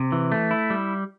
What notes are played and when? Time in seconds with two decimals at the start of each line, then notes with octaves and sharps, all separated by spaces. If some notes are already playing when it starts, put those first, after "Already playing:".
Already playing: C3
0.12 E3
0.32 A3
0.51 E4
0.70 G3